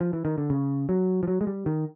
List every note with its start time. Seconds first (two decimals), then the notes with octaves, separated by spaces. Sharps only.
0.01 F3
0.13 E3
0.25 D#3
0.38 D3
0.50 C#3
0.89 F#3
1.23 F3
1.28 F#3
1.41 G#3
1.47 G3
1.66 D#3